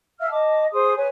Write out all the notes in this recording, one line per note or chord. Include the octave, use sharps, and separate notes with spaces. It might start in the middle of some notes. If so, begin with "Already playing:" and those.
E5 F5 E6 F6
D#5 A5 D6
G#4 C5 C6 D#6
B4 C#5 G#5